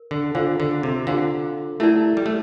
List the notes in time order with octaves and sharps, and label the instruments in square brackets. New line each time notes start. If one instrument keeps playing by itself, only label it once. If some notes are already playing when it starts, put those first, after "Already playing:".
Already playing: [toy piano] A#4
[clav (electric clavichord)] D3
[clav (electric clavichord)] D3 [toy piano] D4 F4 C5 F5 A#5
[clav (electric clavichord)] D3
C3
[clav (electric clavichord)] D3 [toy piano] D4 F4 C5 F5 A#5
[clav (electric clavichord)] A3 [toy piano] E4 G4 A#4 D5 A5
[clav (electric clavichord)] G3
A3